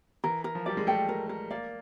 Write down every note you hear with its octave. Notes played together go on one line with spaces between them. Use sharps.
E3 A#4
A#4
F3
G3 D5
G#3
A3 G5
A#4
A#4
A#3 D5